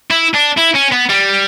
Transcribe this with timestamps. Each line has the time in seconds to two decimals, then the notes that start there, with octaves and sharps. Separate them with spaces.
0.11 E4
0.35 D4
0.58 E4
0.75 C#4
0.92 B3
1.10 G3